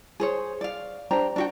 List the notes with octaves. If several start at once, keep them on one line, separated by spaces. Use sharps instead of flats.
G#4 C5 C#5
D5 F5
D4 G4 C5 A#5
D4 F#4 G5